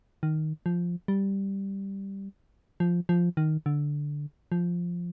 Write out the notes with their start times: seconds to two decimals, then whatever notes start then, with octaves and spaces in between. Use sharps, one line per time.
0.23 D#3
0.66 F3
1.08 G3
2.80 F3
3.09 F3
3.37 D#3
3.66 D3
4.52 F3